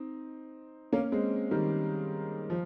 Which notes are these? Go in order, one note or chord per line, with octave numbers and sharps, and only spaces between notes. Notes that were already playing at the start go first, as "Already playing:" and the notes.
Already playing: C4 D#4
A#3 C#4
G#3 C4
D#3 G3
F3